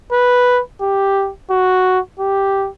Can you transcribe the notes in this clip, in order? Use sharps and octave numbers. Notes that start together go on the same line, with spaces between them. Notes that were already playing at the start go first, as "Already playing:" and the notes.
B4
G4
F#4
G4